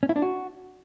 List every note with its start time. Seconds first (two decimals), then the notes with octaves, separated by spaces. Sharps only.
0.03 C#4
0.09 E4
0.16 D4
0.22 F#4